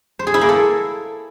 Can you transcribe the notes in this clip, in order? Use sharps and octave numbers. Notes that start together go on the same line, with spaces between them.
C5
G#4
E4
A#3
A4